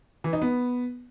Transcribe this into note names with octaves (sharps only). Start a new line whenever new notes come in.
E3
D#4
B3